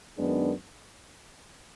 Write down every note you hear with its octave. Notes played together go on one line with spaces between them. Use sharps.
F#2 D#3 G#3 B3 D4